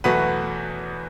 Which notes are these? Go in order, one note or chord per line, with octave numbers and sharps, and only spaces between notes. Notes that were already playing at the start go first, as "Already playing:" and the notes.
E2 B2 F#3 A3 F#4 B4